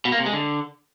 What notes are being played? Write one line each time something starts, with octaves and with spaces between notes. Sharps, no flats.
B2
A#3
C3
G#3
D3